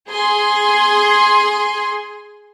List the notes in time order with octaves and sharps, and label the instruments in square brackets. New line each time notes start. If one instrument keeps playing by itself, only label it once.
[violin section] G#4 G#5 C6